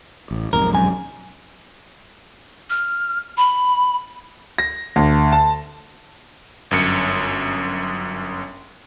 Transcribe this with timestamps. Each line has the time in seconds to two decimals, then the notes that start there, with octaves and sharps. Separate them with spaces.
0.31 A1
0.53 B1 F2 G#2 A#4
0.73 F#2 G#5
2.70 F6
3.37 B5
4.58 A#6
4.96 D2
5.32 A5
6.71 G1 F#2 C#7